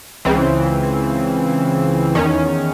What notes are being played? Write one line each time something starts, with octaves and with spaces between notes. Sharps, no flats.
C#2 C#3 E3 C4
E2 D#3 C#4